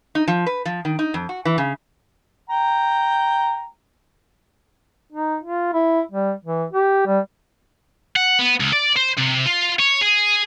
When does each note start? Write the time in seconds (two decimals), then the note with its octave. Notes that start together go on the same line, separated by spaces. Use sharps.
0.15 D#4
0.28 F3
0.46 B4
0.65 F3
0.85 D#3
0.99 D#4
1.14 F2
1.29 F#4
1.45 E3
1.58 C#3
2.50 G5 A#5
5.12 D#4
5.43 F4
5.73 E4
6.12 G3
6.45 E3
6.73 G4
7.07 G3
8.16 F#5
8.39 B3
8.60 C#2
8.73 D5
8.97 C5
9.18 C3
9.46 F4
9.79 C#5
10.01 G#4